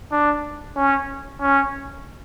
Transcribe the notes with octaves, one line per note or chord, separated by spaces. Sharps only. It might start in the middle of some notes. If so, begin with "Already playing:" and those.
D4
C#4
C#4